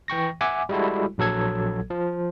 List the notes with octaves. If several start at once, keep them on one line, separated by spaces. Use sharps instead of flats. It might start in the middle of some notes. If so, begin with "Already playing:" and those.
E3 G5 C#6 A#6
E5 F#5 G#5 D6
G3 G#3 E4 F#4 A4
A#1 F#3 A4 G#6
F3